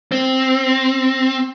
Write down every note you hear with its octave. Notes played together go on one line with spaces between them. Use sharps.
C4